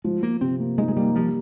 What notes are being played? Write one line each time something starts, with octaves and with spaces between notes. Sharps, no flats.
F3 G#3
F3 A#3
C3 C4
A#3
G#3 D#4
G#3
G3 A#3
F3 G3